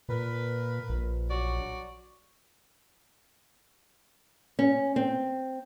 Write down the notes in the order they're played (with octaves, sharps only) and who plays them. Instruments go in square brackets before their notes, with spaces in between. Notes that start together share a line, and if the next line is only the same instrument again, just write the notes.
[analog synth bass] A#2 [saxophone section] A#4 B4
[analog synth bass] A#1
[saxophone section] F#3 F#4 D5
[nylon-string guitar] C#4
C4